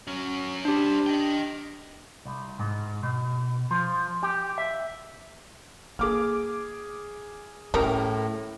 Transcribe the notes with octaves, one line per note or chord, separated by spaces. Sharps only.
F#3 C#4
G3 D4 G4 C5
D#5 G5
C2
G#2
B2
F3
G4
E5
A#3 G#4 D6 F6
A2 C#3 G3 A3 A#4